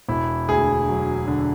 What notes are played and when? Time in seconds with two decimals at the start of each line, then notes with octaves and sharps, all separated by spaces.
0.09 E1 E4
0.49 D2 G#4
0.88 F#3
1.28 D3